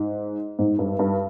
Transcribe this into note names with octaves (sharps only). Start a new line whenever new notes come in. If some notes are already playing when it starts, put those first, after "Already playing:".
Already playing: G#2
G#2
G2
G2